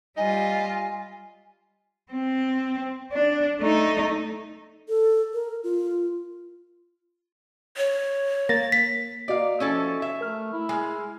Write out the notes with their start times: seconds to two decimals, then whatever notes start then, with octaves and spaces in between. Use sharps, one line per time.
0.17 G3 F4 D#5 G#5
2.12 C4
3.13 D4
3.60 A3 D#4
4.89 A4
5.34 A#4
5.64 F4
7.77 C#5
8.49 A#3 A6 A#6
8.72 B6
9.28 A#3 F#4 D5 D#5 F5
9.60 F3 C#4 E4 A4
10.02 E5
10.21 A3 A#4 F6
10.53 E4
10.69 G#3 G#5 F6